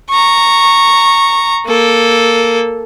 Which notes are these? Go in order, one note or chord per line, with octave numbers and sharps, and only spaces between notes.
A#5 C#6
A#3 A4